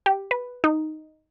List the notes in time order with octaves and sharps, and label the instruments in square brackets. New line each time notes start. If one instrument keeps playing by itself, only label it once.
[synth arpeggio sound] G4
B4
D#4